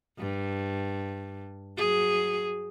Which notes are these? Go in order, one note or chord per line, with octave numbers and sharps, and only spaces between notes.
G2
F#3 G#4